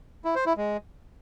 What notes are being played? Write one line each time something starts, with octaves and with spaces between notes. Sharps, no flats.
E4
C5
E4
G#3